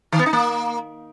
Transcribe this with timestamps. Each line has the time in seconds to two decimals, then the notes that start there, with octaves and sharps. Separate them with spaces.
0.12 D#3
0.19 B3
0.26 D#4
0.33 A#3